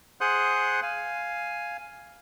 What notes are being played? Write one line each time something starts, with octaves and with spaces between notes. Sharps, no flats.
G#4 C5 F#5 C6 D#6 F#6
F5 G#5